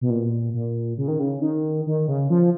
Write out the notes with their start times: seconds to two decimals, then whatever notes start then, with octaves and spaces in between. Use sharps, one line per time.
0.01 B2
0.10 A#2
0.54 A#2
0.98 C#3
1.08 D#3
1.19 C#3
1.41 D#3
1.86 D#3
2.08 C#3
2.30 F3